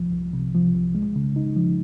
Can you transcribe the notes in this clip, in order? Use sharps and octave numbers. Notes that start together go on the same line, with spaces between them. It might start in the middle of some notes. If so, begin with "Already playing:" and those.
Already playing: C2 F3
C2
C3
F3
C2
G#3
C#3
D#4
F3